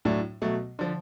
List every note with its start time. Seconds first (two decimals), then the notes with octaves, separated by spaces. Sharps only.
0.05 A2 F#3 A3 D4
0.42 B2 F#3 A3
0.79 D3 F3